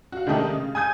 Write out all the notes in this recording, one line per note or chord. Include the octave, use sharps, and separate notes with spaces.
F#4 F5
D#3 G#3 A3 D4 D#4 G4
C#3
G#5 D#6 G6 G#6